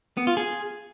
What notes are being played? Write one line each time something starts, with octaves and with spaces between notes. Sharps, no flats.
B3
F4
G#4